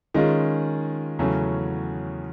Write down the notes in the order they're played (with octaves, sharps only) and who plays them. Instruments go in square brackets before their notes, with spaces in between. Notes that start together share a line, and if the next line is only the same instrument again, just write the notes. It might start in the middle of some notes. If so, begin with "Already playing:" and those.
[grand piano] D#3 G#3 C#4 F4 G#4
E2 C#3 F#3 A3 C#4